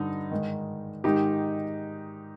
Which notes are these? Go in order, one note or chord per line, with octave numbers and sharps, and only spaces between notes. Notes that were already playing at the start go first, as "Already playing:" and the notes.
Already playing: G2 D3 D#4
G#2 D#3
G#2 D#3 D#4 G4